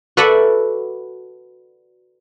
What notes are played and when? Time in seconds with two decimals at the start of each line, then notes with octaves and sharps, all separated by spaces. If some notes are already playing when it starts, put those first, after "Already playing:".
0.17 F#4 A4 B4 D5 E5 F#5